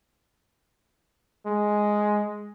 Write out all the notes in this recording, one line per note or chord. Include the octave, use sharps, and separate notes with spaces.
G#3